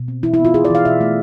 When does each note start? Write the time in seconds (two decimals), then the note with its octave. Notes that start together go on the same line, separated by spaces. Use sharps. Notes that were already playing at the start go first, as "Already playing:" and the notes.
Already playing: B2
0.08 C4
0.23 E3 E4
0.34 E4
0.39 B3
0.45 F4
0.54 E3 G#4
0.65 D5
0.70 E3 F5
0.85 B2 E5
1.01 A3